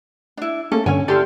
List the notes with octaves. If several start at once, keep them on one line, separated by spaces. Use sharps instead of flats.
D4 E4
A3 A#3 C#4 A4
G2 D3 C#4 C#5 G#5
E4 G4 A4 D5 C6 F6